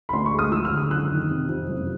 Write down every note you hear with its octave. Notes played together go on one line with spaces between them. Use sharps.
B5
D2 C6
C#6
G#3
D#6
F3 E6
F6
D3
F6
F#1 F#6
D#3
C3
F2
F#1